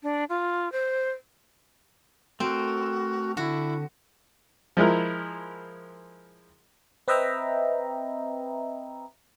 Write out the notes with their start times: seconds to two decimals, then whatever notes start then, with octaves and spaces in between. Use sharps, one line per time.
0.03 D4
0.29 F4
0.72 C5
2.40 A3 C4 F#4 A#4
3.37 D3 E4 F#4
4.77 F3 G#3 E4 A#4
7.08 C4 B4 D#5 E5 G5 A#5